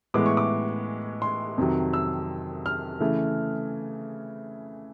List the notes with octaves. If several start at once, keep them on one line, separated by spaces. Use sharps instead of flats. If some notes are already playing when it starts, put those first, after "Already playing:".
A2 E3 G#3 B3 D6
C#6
D6
C6
F2 C3 D#3 F#3
E6
F6
C#3 E3 A3